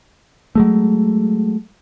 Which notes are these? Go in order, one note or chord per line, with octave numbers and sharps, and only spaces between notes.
F#3 G#3 A3